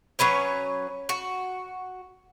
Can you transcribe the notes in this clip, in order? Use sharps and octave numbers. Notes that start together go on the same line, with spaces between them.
F#3 C#4 B4 C#5
F#4